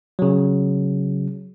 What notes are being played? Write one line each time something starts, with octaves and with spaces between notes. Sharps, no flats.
C#3 F#3